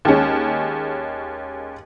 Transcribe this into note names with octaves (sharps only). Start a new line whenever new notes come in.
D#2 G#3 C#4